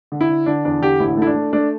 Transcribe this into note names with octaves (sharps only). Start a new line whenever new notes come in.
D3
E4
D3
D3 D4
E2 D4
D3 G4
A1 E4
A3 E4
D4
A3
A3 D4